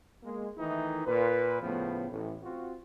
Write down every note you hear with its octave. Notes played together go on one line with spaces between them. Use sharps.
G#3 A#3
D#3 E3 A3 D#4 E4
A#2 B4
A2 C#3 F3 A3 B3
A1
C4 F4 F#4